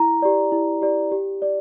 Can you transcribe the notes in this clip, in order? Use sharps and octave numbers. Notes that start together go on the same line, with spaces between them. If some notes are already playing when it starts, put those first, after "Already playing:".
Already playing: E4 A#5
G4 D5
E4
G4 D5
G4
D5